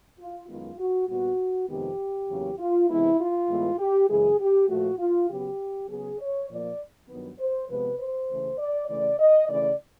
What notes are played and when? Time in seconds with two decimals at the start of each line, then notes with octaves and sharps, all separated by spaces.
0.19 F4
0.48 F#2 D#3 G#3 B3 F4
0.78 F#4
1.08 A#2 G3 B3 F#4
1.68 F2 C3 D#3 G#3 B3 G4
2.29 E2 C#3 F#3 A#3
2.59 F4
2.88 C3 E3 G#3 B3 E4
3.18 F4
3.49 A2 E3 G#3 B3
3.78 G4
4.08 F#2 C#3 E3 G#3 G#4
4.39 G4
4.68 A#2 F3 A3 F#4
4.98 F4
5.28 C#3 F#3 B3 G4
5.88 C#3 F#3 B3 G#4
6.18 C#5
6.48 A#2 F3 A#3 D5
7.08 G2 D#3 F#3 B3
7.38 C5
7.68 C3 F3 G#3 B3 B4
7.99 C5
8.29 C#3 E3 A3
8.58 D5
8.88 C#3 E3 A3 D5
9.18 D#5
9.48 C#3 E3 A3 D5